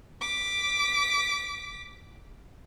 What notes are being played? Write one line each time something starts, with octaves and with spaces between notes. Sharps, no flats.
D6 B6